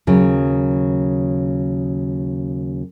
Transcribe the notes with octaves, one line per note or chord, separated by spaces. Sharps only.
D#2 C#3 F#3